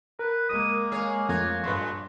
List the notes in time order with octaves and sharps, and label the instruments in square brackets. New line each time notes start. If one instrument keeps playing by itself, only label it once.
[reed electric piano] A#4 [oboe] B4
[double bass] G#3 A#3 [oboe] D#6
[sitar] G#4 C#5 [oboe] F5
[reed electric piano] F2 A3 G#6 [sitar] F4 [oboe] F#4
[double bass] G2 [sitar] A#2 G#3 A3 [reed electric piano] B4 C6 C#6